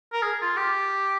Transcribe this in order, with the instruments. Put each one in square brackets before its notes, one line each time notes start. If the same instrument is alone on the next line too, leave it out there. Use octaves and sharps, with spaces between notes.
[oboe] A#4
G#4
F4
G4